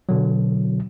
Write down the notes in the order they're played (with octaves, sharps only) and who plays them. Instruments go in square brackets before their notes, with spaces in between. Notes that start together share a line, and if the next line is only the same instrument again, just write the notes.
[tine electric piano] B2 D3 F#3